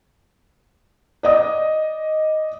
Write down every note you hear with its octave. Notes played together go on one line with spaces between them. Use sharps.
D5 D#5 D#6